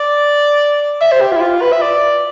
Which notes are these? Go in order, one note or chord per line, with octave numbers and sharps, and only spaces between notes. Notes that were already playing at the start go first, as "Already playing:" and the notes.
Already playing: D5
E5
C5
G4
F4
E4
F4
B4
E5
D5